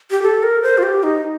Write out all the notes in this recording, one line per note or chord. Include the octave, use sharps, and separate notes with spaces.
G4
A4
A#4
C5
F4
G4
D#4